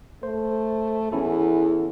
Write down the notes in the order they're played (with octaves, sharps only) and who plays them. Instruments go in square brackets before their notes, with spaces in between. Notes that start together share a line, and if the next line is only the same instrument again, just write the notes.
[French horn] A3 [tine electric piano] C5
[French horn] E2 [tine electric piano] C#4 E4 A4